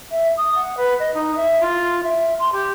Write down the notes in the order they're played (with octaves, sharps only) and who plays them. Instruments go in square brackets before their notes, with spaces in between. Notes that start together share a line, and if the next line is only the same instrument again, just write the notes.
[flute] E5
D#6
F#5
B4
D#5
D#4
E5
F4
E5
C6
G4